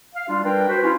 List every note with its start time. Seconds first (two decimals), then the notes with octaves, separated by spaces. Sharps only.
0.15 F5
0.28 G3 D4 F4
0.44 G3 D4 A#4 B4 G5
0.69 F#4 B4 C5
0.83 C#4 E4 F4